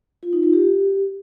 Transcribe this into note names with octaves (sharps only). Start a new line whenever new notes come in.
F4
D#4
F4
G4